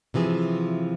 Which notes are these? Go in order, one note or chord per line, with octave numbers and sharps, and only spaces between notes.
C3 E3 F3 G#4